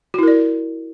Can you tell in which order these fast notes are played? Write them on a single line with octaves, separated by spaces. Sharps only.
F#4 E4 A#4 D5